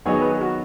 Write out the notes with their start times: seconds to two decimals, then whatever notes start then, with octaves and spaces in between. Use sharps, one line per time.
0.05 D#3 F#3 B3 D#4 G#4 C#5
0.21 B4
0.32 G#4
0.41 F#4